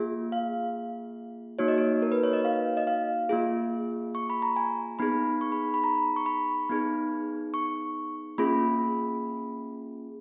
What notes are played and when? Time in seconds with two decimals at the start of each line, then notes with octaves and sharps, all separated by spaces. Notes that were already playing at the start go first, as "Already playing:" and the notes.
Already playing: A#3 F4 G#4
0.32 F5
1.59 A#3 D#4 F#4 C#5
1.68 D#5
1.78 C#5
2.02 A#4
2.12 B4
2.23 C#5
2.33 D#5
2.45 F5
2.77 D#5
2.87 F5
3.29 A#3 F4 G#4
4.15 C#6
4.30 B5
4.42 A#5
4.56 G#5
4.99 B3 D#4 G#4 B5
5.41 C#6
5.52 B5
5.74 B5
5.84 A#5
6.16 C#6
6.26 B5
6.70 B3 D#4 G#4
7.54 C#6
8.38 A#3 C#4 F4 G#4 B5